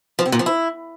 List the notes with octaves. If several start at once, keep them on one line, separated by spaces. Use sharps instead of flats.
F3
C3
A#2
F3
E4